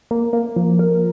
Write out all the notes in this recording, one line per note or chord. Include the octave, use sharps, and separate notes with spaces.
A#3
A#3
F3
A#4